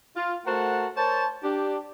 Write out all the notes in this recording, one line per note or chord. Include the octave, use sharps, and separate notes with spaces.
F4
A3 F#4 A#4 C5 F#5 A5
A#4 C5 C#5 A5
D4 G4